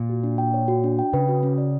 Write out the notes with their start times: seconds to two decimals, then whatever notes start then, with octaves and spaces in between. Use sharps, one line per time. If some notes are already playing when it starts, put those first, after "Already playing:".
Already playing: A#2
0.09 F#4
0.23 D4
0.38 G5
0.54 C#5
0.68 F#4
0.84 D4
0.99 G5
1.13 C#3 B4
1.29 F#4
1.43 C#4
1.58 D5